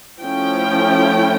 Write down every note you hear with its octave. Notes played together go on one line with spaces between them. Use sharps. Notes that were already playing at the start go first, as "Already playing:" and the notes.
F3 A3 C#4 E4 G5